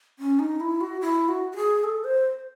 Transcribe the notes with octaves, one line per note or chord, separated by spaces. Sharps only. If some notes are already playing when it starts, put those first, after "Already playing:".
C#4
D#4
E4
F#4
E4
F#4
F#4
G#4
A4
C5